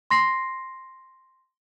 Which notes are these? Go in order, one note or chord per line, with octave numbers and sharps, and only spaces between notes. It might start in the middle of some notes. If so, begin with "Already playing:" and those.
C6 A#6 C7